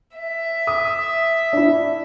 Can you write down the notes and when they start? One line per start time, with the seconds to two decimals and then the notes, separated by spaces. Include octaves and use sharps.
0.17 E5
0.67 D#6
1.53 D4 E4